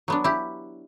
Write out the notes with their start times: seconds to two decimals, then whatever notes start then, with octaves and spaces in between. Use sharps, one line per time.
0.08 F#3 B3 D4
0.24 E4 G4